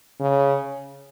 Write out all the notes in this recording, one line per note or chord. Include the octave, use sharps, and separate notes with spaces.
C#3